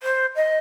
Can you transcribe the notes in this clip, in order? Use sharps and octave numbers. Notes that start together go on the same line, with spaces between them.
C5
D#5